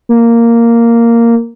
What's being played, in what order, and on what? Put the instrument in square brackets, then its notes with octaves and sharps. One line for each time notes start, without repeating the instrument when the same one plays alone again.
[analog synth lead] A#3